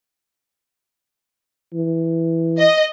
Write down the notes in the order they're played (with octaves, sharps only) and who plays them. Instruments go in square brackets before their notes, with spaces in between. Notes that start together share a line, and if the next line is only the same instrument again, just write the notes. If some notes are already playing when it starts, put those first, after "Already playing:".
[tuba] E3
[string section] D#5